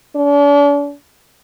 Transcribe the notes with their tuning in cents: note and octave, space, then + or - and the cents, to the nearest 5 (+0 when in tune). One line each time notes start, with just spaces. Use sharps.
D4 -40